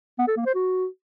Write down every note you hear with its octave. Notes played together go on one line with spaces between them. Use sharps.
B3
A4
A#3
C5
F#4